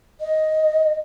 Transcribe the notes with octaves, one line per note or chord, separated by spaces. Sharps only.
D#5